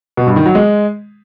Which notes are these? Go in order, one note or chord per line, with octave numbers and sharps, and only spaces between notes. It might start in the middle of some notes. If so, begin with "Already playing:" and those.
B2
G2
D#3
F#3
G#3